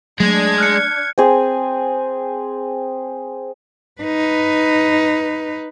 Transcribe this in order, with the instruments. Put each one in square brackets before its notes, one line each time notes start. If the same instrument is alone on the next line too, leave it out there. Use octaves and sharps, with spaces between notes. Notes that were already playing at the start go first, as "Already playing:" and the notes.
[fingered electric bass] F#3 A3 [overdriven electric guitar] G#3 [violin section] D4 G#6
[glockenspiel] F6 F#6 C#7
[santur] C4 G#4
[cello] D#4 B4